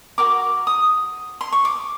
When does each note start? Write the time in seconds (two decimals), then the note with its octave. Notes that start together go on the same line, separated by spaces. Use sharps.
0.18 F#4 A#4 D6
0.67 D#6
1.41 C6
1.52 C#6
1.65 D6